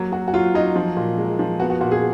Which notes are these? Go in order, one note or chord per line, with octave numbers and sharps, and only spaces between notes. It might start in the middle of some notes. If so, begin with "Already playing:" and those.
Already playing: F#3 A#3
F#3 F#4
F#4
F#3 F4
F#3 D#4
F3
A#2
G#3
F3
B3 F#4
F#4
A#2 F#4
G#4